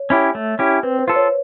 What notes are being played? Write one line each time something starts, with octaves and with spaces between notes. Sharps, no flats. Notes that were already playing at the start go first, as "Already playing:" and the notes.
Already playing: C#5
C#4 E4 G4
A3
C#4 E4 G4
C4 B4
C5
F4 A4
C#5